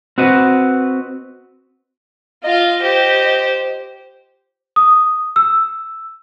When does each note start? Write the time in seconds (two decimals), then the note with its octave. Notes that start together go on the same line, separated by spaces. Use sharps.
0.18 C4 F#4 B4 D#5
2.44 F4 D#5 F5
2.82 G4 C5
4.76 D#6
5.36 E6